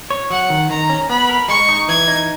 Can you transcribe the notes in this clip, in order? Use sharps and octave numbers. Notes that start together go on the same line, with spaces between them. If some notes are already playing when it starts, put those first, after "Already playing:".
C#5
F#3 F#5
D#3
D#3 A#5
C#4
B3 B5
A#4
G#3 C#6
D#4
E3 G#6
D#4